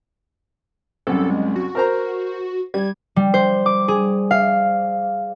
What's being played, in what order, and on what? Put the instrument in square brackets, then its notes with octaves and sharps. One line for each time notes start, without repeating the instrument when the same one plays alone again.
[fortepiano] C2 F#2 [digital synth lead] A4
[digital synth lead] G#3
F#4
[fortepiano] A#4 C5 A#5
[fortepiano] G3 [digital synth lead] G#6
[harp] G3
C5
D6
G#4
F5